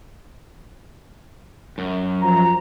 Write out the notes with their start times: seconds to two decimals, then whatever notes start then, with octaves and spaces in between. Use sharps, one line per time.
1.78 F#2
2.21 F3 A#5